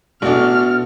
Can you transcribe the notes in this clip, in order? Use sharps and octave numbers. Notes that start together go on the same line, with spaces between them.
A1 B2 D4 F#4 A4 F6